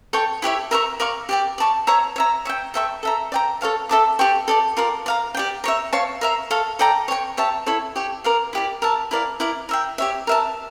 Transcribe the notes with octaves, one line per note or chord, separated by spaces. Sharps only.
A4 C#5 G5 C#6
E4 G4 C#5 E5
A#4 E5 A#5 C#6
A#4 D5 F5 C#6
G4 D5 G5
D5 A5 C#6
C#5 E5 A#5
C#5 E5 A#5
C#5 E5 G5
A4 E5 G5 C#6
A4 E5 A#5
D5 G5 A#5
A4 C#5 F5 A5
A4 E5 A5 D6
G4 D5 G5 C#6
A4 D5 A5
F4 A#4 D5
D5 F5 A#5
G4 D5 G5
A#4 C#5 E5
C#5 F5 A5 C#6
A#4 E5 A#5
A4 C#5 F5
A4 D5 G5 A#5
C#5 G5 C#6
G4 C#5 E5 A5
E4 A4 C#5
G4 C#5 G5
A#4 D5 F5
E4 G4 D5
A#4 E5 A5
E4 A#4 D5 F5
E4 A#4 D5
A#4 E5 G5
G4 C#5 E5
A#4 E5 A5